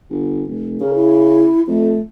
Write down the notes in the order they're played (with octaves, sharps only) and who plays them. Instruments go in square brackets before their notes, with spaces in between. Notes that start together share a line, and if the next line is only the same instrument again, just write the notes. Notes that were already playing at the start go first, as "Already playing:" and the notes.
[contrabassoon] G1
F1
[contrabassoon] C#3 [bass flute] A#4
[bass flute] E4
[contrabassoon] F2 [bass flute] A3